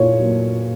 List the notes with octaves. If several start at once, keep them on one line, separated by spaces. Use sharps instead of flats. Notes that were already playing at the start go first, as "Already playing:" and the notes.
Already playing: A#2 C#5
F#3 A#3